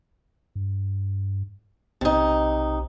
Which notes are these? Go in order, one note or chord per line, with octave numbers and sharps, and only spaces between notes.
G2
B1 C3 D#4